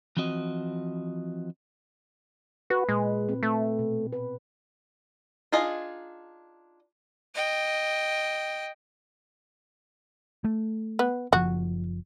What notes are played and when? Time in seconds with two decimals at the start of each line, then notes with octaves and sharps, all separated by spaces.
0.17 E3 F3 C4 F#4 D#5
2.70 F#4 B4
2.89 A#2 G#3
3.29 C4
3.43 A3
3.79 B2
4.13 B4
5.52 D4 D#4 F4 G#4 D#5
7.34 D#5 G5
10.44 A3
10.99 B3
11.33 F#1 F3 F#4